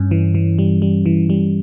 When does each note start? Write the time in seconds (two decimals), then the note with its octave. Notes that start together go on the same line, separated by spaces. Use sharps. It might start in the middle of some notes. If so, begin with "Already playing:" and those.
Already playing: G2 C#4
0.11 E3
0.35 E3
0.59 G3
0.82 G3
1.06 E3
1.30 G3